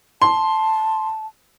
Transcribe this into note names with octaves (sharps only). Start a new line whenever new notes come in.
A5 C6